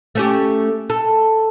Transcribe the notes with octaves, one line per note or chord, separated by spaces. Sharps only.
A3 C#4 G4
A4